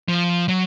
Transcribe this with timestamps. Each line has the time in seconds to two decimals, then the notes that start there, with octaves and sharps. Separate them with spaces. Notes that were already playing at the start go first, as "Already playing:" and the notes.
0.09 F3
0.48 F#3